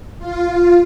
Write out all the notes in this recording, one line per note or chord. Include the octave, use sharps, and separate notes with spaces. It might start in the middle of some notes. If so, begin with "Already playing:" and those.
F4